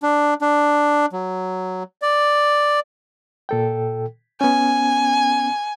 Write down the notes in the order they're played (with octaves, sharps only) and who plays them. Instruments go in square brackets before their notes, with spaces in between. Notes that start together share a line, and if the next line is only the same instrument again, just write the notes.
[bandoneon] D4
D4
F#3
D5
[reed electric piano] A#2 A4 G5
[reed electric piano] B3 C#4 [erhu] G#5